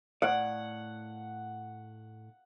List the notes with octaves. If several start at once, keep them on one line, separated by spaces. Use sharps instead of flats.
A2 D5 F#5